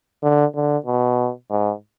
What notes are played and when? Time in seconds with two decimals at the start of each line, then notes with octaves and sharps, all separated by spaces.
0.23 D3
0.55 D3
0.86 B2
1.50 G#2